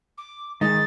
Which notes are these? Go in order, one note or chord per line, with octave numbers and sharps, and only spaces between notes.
D6
D#3 G#3 D#4 A6